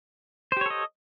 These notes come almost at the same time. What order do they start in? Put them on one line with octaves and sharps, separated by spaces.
C5 G4 C#5 A4 D#5